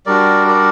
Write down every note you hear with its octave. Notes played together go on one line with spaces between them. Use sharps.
G3 D4 F#4 A#4 D5
A#4 D5